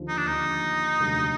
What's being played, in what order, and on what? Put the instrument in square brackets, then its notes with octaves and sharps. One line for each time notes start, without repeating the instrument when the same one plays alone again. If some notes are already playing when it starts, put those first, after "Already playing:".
Already playing: [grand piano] D#2 D3 F3
[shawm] D#4
D4
[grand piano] D#2 D3 F3 [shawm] D#4
[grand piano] F1 D#2 D3 F#3